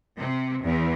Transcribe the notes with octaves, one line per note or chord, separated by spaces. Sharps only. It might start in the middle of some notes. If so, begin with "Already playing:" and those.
C3
E2